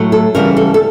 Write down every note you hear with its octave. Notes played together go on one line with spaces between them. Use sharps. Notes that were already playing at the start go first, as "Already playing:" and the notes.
Already playing: A2 F#3 A3
A4
C#3 E3 G3 B3 A#4
A4
A4